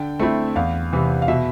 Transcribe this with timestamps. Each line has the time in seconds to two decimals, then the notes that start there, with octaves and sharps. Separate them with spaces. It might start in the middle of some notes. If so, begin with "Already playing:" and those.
Already playing: D3 G5
0.19 A3 C4 E4
0.56 E2 F5
0.93 C3 E3
1.22 F5
1.28 B2 E5